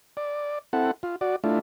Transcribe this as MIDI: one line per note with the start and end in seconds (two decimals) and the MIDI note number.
0.17 0.59 74
0.73 0.91 60
0.73 0.91 64
0.73 0.91 69
0.73 0.91 78
1.03 1.16 65
1.21 1.36 66
1.21 1.36 74
1.44 1.59 57
1.44 1.59 62
1.44 1.59 64
1.44 1.59 65